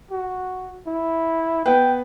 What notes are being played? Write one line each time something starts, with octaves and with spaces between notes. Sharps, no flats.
F#4
E4
B3 B4 G5